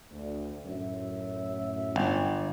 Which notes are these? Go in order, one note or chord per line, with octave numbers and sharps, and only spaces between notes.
D2
F#2 A2 E5
G1